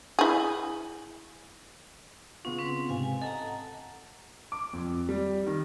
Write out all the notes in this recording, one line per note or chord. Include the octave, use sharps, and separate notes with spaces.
E4 G#4
C#3 B3 C#4 F4
C4 C#4 B4
G#2 C3 C4 F5 G#5
G#5
A4 D#5 F#5 A5 A#5
D6
F2
G3
D#3